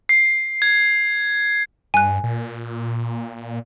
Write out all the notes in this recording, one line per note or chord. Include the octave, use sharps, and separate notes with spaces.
C7
G#6
G2 G#5 F#6
A#2